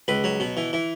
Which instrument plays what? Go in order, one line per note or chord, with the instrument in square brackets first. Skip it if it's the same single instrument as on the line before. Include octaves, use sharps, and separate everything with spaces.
[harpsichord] C#2 B4
F#3
B2
E3
E3